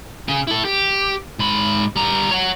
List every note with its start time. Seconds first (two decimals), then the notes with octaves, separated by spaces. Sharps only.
0.28 C#3 G#5
0.47 E4 A4
0.65 G4
1.39 G#2 B5
1.96 G3 A#5
2.31 C#5 F#5